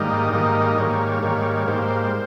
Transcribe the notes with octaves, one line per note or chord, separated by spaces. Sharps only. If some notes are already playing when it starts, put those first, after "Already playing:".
Already playing: G#2 D#3 G3 A#3 D#5
G#2 D#3 G3 A#3 D#5
G#2 D#3 G3 A#3 C#5
G#2 D#3 G3 A#3
C#5
G#2 G3 A#3 C5